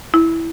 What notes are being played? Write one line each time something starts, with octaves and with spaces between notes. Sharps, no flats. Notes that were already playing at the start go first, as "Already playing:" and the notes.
E4